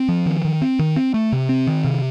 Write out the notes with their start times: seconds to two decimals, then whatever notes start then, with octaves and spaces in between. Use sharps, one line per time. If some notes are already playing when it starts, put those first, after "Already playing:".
Already playing: C4
0.09 F3
0.26 D#3
0.45 D#3
0.62 C4
0.79 D#3
0.96 C4
1.14 A3
1.32 C3
1.49 C4
1.67 D#3
1.85 C3